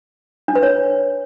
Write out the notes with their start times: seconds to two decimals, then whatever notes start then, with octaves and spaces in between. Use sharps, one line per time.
0.48 D4
0.55 B4
0.63 C#5